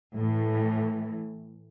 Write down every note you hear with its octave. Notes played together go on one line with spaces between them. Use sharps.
A2 E3